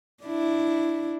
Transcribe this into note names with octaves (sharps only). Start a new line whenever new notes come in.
D4 E4